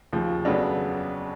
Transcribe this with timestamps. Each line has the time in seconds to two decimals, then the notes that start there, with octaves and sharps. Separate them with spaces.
0.13 D#2 C#3 F3
0.45 F2 C#3 F#3 B3 D4